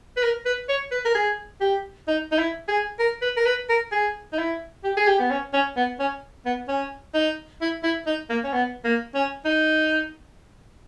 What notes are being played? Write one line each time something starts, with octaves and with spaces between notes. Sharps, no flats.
B4
A#4
B4
C#5
B4
A#4
G#4
G4
D#4
D#4
E4
G#4
A#4
B4
A#4
B4
A#4
G#4
D#4
E4
G4
G#4
G4
B3
C#4
C#4
B3
C#4
B3
C#4
D#4
E4
E4
D#4
A#3
C#4
B3
A#3
C#4
D#4